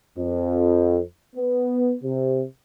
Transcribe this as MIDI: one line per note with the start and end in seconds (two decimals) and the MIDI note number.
0.18 1.00 41
1.36 1.95 59
2.04 2.43 48